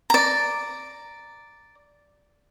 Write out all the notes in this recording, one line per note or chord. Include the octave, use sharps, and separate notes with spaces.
D5 A#5